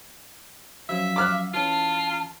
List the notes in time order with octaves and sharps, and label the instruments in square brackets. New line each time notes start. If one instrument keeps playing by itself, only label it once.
[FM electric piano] F3 F#3 C#4 [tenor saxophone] E5 [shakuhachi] F5
[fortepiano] D6 F6 F#6
[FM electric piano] E3 C#4 [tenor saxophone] F4 [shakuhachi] A5